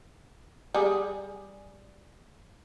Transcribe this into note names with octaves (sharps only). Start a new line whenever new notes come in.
G3 G#4